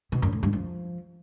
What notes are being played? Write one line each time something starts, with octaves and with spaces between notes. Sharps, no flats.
B2
F#2
A2
G2
F3